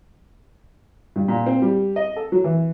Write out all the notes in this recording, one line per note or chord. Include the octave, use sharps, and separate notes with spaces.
G2
A#2
C4
G3
D#5
A4
F#3
E3